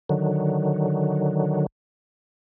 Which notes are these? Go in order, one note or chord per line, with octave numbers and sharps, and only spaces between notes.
D3 D#3 F#3